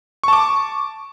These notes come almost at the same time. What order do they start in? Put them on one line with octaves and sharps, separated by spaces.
C#6 A5 D6